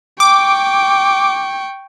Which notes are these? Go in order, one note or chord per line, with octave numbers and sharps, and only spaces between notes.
G5 C#6 D6